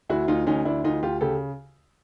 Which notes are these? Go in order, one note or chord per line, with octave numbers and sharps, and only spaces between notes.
D2 E4 F#4
D2 D#4 F4
D2 C#4 D#4
D2 D4 E4
D2 D#4 F4
D2 F4 G4
C#3 G4 A4